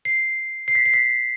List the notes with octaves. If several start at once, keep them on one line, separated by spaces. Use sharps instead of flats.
C7
C7
B6
C7
B6